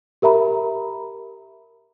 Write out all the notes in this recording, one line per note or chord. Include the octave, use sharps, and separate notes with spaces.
G4 A#4 E5 A#5 B5